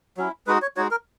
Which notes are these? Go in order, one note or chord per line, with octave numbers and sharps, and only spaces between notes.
F#3 C#4 E4
G#3 D#4 F#4 B4
C#5
G#3 D#4 F#4 C#5
A#4